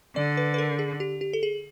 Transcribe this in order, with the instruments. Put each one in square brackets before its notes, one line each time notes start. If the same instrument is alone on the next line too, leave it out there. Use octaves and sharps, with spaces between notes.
[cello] D3 [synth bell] D5
[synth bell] B4
B4
A#4
G#4
G4
G4
A4
G#4